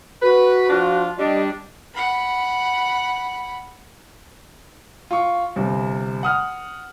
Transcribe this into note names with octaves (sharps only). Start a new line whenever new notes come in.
F#4 B4
F3 D4 F4
G3 D4 D#5
F#5 B5
F4 C#6
G1 C3
F#5 D#6 F6